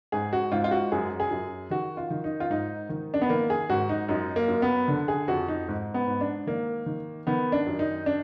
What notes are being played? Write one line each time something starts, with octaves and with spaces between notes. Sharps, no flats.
G#2 G#4
F#4
G#2 F4
F4
F#4
F#2 G#4
G#4
F#2
D#3 F#4
F4
D#3
D#4
F4
G#2 D#4
D#3
D4
B3
D#3 A#3
G#4
G#2 F#4
D#4
F#2 D#4
A#3
F#2
B3
D3
G#4
F2 F#4
D#4
G#2
B3
G#2
D4
D#3 A#3
D#3
D#3 B3
D4
F#2
D#4
D4